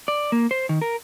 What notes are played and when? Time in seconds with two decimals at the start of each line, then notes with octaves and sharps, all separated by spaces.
0.08 D5
0.32 A#3
0.51 C5
0.69 D#3
0.81 A#4